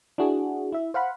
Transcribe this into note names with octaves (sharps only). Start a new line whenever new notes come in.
D4 E4 F#4 G#4
E4 E5
C5 F5 F#5 B5